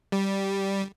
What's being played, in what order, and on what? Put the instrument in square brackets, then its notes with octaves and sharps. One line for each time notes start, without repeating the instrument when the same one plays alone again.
[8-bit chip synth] G3